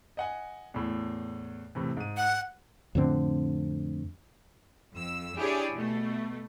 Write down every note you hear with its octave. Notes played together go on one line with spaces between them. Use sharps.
D#5 F#5 G#5
E2 A2
A2 C3 E3
G#2 D#7
F#5
F2 A2 D3 C4
F2 E6
D4 E4 G4 G#4 C#5 D5
B2 A3